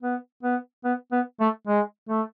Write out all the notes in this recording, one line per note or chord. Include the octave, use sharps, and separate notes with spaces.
B3
B3
B3
B3
A3
G#3
A3